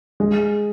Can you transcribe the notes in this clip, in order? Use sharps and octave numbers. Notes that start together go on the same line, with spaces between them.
G#3